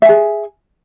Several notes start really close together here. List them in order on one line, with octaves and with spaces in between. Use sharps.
E5 G#5 G#4